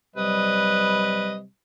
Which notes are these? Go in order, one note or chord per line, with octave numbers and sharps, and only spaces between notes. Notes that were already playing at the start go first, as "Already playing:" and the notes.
C3 F#3 G3 B4 D#5